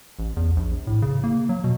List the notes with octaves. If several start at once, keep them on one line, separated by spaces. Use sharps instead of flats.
A1
E2
A#1
A2
C#3
A#3
F#3
B2